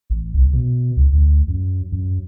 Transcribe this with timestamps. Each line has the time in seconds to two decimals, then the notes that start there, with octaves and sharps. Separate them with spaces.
0.10 A1
0.34 C2
0.53 B2
0.96 C#2
1.12 D2
1.48 F#2
1.92 F#2